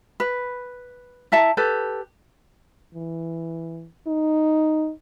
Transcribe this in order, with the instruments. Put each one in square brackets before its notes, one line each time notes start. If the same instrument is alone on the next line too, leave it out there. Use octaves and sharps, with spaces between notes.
[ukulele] B4
E4 E5 A5 A#5
G4 A4 B4
[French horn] E3
D#4